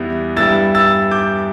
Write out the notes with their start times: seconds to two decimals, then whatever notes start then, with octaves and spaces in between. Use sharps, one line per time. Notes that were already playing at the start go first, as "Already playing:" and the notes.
Already playing: E2 G3 B3 E4
0.36 G2 G3 E4 E6 A6
0.75 E6 A6
1.11 D6 G6